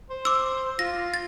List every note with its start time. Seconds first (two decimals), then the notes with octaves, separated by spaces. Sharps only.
0.10 C5
0.25 D6 E6
0.79 F4 A#6
1.14 A6